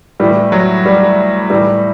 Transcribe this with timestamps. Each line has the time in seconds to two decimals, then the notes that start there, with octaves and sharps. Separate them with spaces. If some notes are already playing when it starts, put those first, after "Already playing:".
0.20 A2 E3 G3
0.52 F#3
0.86 G3
1.50 A2 E3 G3